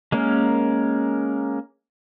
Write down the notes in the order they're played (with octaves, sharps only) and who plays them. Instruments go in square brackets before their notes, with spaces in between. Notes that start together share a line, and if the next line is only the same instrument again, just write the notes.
[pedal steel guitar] G#3 A#3 C#4 A#4